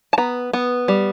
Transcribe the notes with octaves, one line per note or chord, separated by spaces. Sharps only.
A5
B3 A#5
B3
G3